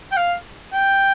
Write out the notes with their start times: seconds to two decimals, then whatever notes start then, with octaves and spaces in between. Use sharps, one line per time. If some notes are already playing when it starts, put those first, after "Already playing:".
0.12 G5
0.17 F5
0.73 G5